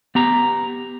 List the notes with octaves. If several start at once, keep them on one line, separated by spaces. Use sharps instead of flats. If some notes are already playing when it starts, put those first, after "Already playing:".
B3 G4 A#5